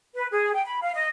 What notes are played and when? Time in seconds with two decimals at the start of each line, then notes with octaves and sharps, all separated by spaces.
0.16 B4
0.31 G#4
0.54 G5
0.67 B5
0.82 F5
0.95 D#5